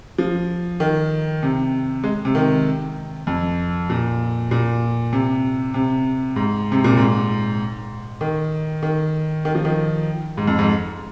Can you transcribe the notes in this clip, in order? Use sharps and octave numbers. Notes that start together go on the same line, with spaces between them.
F3
D#3
C3
G#3
C3
D#3
F2
A#2
A#2
C3
C3
G#2
C3
A#2
G#2
D#3
D#3
D#3
F3
D#3
G#2
F2
G#2